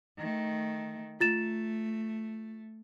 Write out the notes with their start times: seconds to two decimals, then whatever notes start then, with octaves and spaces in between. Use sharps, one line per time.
0.18 D#3 A3
1.20 A3 F4 A6 E7